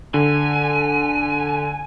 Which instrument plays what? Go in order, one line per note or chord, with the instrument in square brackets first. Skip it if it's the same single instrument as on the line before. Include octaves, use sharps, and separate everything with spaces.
[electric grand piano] D3 [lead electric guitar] G#5